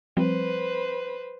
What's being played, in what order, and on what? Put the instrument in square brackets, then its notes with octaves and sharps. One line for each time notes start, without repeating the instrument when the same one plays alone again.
[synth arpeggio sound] F3 G3 C4 [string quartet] B4 C5